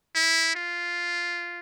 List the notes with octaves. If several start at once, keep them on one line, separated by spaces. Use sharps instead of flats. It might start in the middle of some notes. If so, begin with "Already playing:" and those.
E4
F4